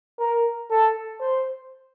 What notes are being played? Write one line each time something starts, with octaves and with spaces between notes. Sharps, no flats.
A#4
A4
C5